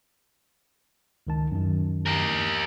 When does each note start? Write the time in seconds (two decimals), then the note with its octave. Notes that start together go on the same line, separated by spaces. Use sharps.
1.27 C#2 D#3 A5
1.52 F#2 D#3
2.06 G4 A#4